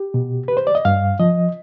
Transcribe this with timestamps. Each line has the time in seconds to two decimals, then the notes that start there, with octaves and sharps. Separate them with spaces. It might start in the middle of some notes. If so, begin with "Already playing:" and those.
Already playing: G4
0.14 B2
0.48 B4
0.57 C5
0.67 D5
0.75 D#5
0.85 G2 F5
1.20 F3 D#5